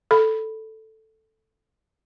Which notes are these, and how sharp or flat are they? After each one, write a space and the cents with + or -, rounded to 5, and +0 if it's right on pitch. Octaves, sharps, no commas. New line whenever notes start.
A4 +0 B5 +0